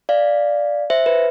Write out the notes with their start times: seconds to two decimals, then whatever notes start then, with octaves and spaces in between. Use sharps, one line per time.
0.09 D5 F5
0.90 C5 E5
1.06 B4